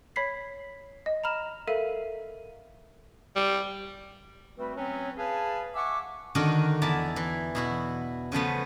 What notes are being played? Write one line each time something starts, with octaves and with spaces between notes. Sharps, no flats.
C#5 B5 B6 C7
D#5
A#5 B5 F6 E7
A4 A#4 E5 F5 D#7
G3
G3 A3 C4 F#4 B4
F#3 C4 C#4 B4 C#5
G#4 B4 F5 G#5 A5
E5 F#5 G#5 C#6 D6
D3 D#3 D4 D#4 F#4 A#4
E2 E4 D5 E5 A5 A#5
E3
B2 E4 F#4
C#3 F3 A3 B3